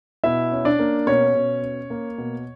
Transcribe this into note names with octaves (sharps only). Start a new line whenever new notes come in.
B2 E4 E5
C#4
D4 D5
A#3
B2 C#4 C#5
B2
C#4
A#3
B2